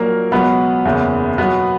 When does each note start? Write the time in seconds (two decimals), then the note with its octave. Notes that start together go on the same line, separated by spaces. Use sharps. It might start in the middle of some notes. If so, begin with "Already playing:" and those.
Already playing: A#1 A#2 F#3 A#3 A#4
0.32 C#2 B2 F#3 B3 B4
0.85 F#1 E2 C#3 E3
1.38 B1 B2 F#3 B3 B4